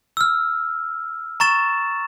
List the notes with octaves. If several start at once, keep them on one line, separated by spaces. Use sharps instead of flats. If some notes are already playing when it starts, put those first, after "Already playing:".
E6 F6
A#5 C#6 A6 E7